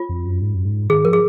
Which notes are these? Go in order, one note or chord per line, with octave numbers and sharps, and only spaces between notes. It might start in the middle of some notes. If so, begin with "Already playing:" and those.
Already playing: F4
F2
F#2
G#2
F#2
G#2
D#3 G#4
F3 A#4
G#4